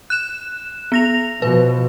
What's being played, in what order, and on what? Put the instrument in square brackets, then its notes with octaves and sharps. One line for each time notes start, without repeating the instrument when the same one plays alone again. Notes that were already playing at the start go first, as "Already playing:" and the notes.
[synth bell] F#6 E7
B3 A#6 F7
[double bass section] B2 F3 [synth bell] B4